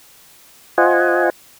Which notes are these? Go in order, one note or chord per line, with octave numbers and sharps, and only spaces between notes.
F4 C5 D#5 F#5 G#5